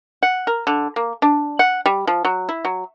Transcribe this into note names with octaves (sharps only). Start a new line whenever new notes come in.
F#5
A#4
D3
A#3
D4
F#5
G3
F3
F#3
E4
F#3